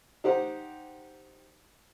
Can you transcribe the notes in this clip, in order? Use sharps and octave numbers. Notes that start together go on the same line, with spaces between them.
D#4 G4 C5 F#5